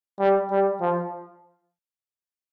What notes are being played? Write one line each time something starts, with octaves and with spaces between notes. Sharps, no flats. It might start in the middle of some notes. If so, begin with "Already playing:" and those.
G3
G3
F3